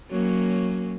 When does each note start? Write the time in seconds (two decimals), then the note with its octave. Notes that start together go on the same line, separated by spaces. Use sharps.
0.10 F#3 A#3 C#4